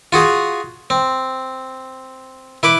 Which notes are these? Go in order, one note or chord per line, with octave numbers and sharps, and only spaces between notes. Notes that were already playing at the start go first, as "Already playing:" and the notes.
F4 F#4 G#4
C4
E4 B4 D6